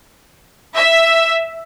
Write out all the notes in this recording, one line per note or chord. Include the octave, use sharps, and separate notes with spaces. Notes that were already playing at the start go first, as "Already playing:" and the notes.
E5